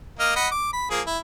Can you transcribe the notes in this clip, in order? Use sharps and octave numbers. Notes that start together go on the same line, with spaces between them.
A#3 D#5 F6
D#5 F#5 B5
D6
B5
F3 A#3 G#4
E4